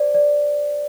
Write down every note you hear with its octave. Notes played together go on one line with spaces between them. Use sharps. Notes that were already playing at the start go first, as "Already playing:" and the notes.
Already playing: C5 D5
D5